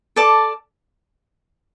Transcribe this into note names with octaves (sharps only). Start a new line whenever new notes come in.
A4 D5 A5 D6